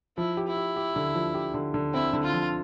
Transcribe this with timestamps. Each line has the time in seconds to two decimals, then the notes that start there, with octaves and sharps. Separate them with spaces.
0.17 F3 E4
0.37 G4
0.47 E4
0.57 G4
0.76 G4
0.96 D3
1.15 F3
1.34 G4
1.54 D3
1.74 D3
1.94 C4 E4
2.13 D3
2.24 F4
2.33 F3